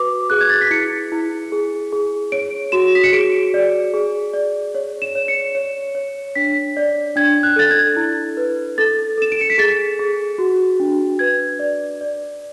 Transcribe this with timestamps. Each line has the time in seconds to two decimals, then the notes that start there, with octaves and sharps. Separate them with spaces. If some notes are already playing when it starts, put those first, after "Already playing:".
Already playing: F#4 B4 D6
0.30 G#4 F#6
0.41 G#6
0.50 A6
0.61 B6
0.71 E4 C#7
1.12 E4
1.52 G#4
1.93 G#4
2.32 C#5 D7
2.72 F#4 E7
2.95 B6
3.04 C#7
3.13 G#4 D7
3.54 D5
3.94 G#4
4.33 D5
4.75 C#5
5.02 E7
5.15 C#5
5.28 C#7
5.55 C#5
5.95 C#5
6.35 D4 B6
6.77 D5
7.16 D4 G#6
7.43 F#6
7.56 A4 A6
7.71 G#6
7.96 E4
8.37 B4
8.78 A4 A6
9.18 A4 E7
9.32 D7
9.41 C#7
9.50 B6
9.58 G#4 A6
9.99 G#4
10.38 F#4
10.80 D4
11.19 B4 G#6
11.59 D5
12.01 D5